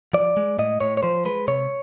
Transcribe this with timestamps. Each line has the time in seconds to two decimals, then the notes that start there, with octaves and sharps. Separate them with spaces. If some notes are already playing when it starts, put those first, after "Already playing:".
0.13 F3 D5
0.37 G#3
0.59 A2 D#5
0.81 A2 C#5
0.97 C#5
1.03 F3 C5
1.25 G#3 B4
1.48 C3 C#5